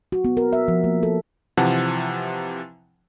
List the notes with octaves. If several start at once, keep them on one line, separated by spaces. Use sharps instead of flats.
F#4
B3
A#4
E5
F3
A#3
A4
C3 E3 F3 F#5 A5